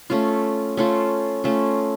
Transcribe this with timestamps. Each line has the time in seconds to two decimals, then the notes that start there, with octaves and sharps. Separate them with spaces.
0.10 A3 C#4 F4
0.77 A3 C#4 F4
1.44 A3 C#4 F4